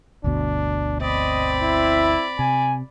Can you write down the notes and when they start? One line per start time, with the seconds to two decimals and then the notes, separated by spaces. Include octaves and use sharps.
0.24 G1 D2 B2 D4
1.01 C4 D5 D#5 B5
1.62 E4
2.39 C3 G#5